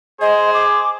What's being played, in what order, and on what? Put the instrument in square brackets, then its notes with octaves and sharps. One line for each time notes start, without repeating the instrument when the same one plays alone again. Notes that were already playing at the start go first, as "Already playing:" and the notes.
[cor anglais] G#4 [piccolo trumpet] C5 [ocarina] D#5
[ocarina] D6